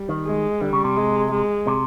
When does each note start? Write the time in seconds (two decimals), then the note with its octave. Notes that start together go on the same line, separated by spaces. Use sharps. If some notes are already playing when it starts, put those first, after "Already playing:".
Already playing: G3
0.09 D#3
0.26 G#3
0.61 D3 G3
0.73 C#3
0.84 C3
0.96 G#3
1.32 G#3
1.67 C3